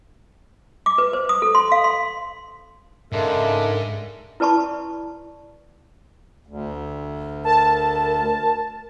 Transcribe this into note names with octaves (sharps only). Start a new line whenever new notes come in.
D6
B4
C5
D#6
A4
C6
F5
C6
G#2 C#3 G#3 D4 A4 A#4 E5
E4 B4 D5 A5 B5 C#6
D2
A#4 A5